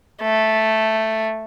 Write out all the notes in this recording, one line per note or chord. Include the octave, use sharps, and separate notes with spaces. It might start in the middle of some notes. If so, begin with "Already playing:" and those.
A3